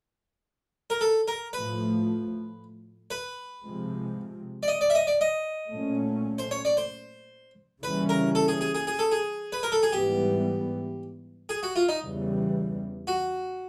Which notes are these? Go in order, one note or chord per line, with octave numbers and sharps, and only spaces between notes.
A#4
A4
A#4
A2 F3 A3 B4
B4
C3 F3 G#3 C4
D5
D#5
D5
E5
D#5
D5
D#5
A#2 F#3 A3 C#4
C5
C#5
D5
C5
C#3 E3 G3 A#3 C#4 B4
A#4
A4
G#4
G#4
G#4
G#4
A4
G#4
B4
A#4
A4
G#4
G#2 E3 G3 B3 G4
G#4
F#4
F4
D#4
E2 C#3 E3 G3
F#4